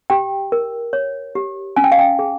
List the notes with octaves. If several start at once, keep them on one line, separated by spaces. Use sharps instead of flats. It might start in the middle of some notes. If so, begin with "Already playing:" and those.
G4 G5
A#4
C#5
G4
C#4 G#5
G5
F5
G5
G#4